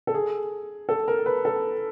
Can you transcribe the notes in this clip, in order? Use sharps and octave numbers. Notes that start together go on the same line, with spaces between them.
A4
G#4
A4
A#4
B4
A4